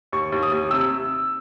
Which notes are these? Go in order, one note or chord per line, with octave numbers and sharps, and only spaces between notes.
D#2 C#6
D#2
D#6
D#2
C3 E6